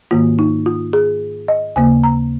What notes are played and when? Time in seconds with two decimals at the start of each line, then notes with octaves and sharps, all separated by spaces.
0.11 G#2 D#3 A#3 F4
0.39 D#4
0.66 F4
0.93 G#4
1.48 D#5
1.76 D#2 C#3 A#3 G#5
2.03 A#5